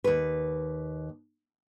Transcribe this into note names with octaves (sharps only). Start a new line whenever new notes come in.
D#2 B4